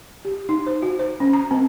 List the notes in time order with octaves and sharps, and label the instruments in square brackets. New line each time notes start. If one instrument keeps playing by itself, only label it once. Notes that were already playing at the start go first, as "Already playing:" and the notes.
[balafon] G4
D#4
C5
F#4
C5
C#4
A#5
C4